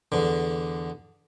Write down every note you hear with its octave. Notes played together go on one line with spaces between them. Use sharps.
E2 D3